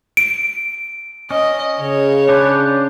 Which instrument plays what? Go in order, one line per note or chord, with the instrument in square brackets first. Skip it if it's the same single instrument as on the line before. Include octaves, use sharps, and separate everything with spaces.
[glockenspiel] D7
[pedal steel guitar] C#4 [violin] D#5
[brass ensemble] C#3 [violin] C#5
[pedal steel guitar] D4 B4 C5